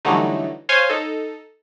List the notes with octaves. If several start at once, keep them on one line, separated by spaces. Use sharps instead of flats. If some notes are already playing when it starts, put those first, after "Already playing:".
D3 E3 F#3 G3 A3 D#4
C5 C#5 F5 G#5 C6
D#4 A4